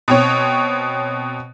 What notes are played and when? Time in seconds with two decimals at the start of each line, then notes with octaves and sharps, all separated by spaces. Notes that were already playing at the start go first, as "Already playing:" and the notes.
0.08 B2 C4 C#5